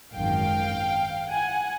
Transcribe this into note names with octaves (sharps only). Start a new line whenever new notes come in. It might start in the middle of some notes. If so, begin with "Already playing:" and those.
G#1 F#2 D#3 F5 G5
F#5 G#5